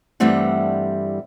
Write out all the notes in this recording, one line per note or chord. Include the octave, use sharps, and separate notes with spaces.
G2 E3 G3 A3 C4 F#5